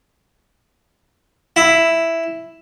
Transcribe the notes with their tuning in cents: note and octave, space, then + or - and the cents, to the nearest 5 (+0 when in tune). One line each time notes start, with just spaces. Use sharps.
E4 +0